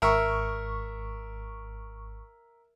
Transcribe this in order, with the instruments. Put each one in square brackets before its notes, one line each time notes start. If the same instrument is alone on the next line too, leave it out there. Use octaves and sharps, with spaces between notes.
[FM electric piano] G#1 C#6 [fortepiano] A#4 E5